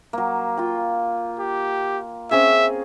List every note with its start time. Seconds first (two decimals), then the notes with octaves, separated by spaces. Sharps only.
0.13 F#3 A#3
0.57 F4 G5
1.39 G4
2.31 C4 C#4 G#4 E5